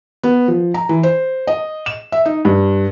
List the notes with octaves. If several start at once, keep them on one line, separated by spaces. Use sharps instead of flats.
B3
F3
A#5
E3
C5
D#5
E7
E5
D#4
G2